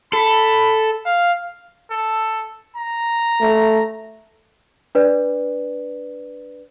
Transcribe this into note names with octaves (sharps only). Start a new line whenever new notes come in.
A4 B5
F5
A4
A#5
A3
D4 B4 D5